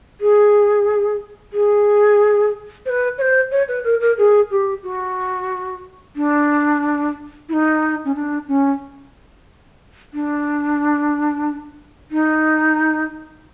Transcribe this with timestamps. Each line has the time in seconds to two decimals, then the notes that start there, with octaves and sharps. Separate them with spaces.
0.21 G#4
1.53 G#4
2.86 C5
2.89 B4
3.18 C#5
3.21 C5
3.51 C#5
3.68 B4
3.84 A#4
4.00 A#4
4.18 G#4
4.51 G4
4.83 F#4
6.16 D4
7.49 E4
7.53 D#4
8.05 C#4
8.15 D4
8.48 C#4
10.14 D4
12.11 D#4